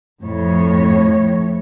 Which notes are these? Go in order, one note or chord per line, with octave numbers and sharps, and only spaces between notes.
F2 A2 F3 C#5